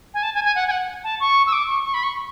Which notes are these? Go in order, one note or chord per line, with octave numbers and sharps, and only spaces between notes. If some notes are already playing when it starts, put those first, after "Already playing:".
G#5
A5
G#5
G#5
F#5
G#5
F#5
A5
C#6
E6
D6
C#6
C#6
B5
C#6